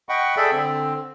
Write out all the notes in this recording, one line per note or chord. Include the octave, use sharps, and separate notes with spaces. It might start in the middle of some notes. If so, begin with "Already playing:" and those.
D#5 F#5 G5 B5 C#6
G#4 A4 D5 E5 G5 B5
D3 C4